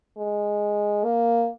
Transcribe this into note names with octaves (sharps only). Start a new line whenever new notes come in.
G#3
A#3